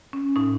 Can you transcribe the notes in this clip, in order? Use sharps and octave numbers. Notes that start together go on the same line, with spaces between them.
C#4
A2 D#4